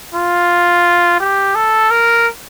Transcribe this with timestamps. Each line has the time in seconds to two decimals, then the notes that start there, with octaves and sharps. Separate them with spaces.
0.15 F4
1.20 G4
1.55 A4
1.91 A#4